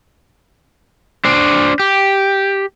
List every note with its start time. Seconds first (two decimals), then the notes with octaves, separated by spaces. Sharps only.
1.25 D4 C5
1.80 G4